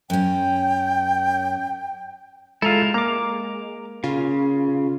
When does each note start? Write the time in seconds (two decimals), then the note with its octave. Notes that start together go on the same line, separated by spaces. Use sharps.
0.10 F#2 C#4 G5
2.62 G#3 E4 F4 A4 A#5
2.94 A#3 A#5 D6
4.04 C#3 F4